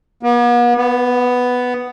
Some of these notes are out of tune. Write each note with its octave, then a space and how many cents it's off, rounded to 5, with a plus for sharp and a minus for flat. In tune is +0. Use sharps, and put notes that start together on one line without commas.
B3 -45
B3 +5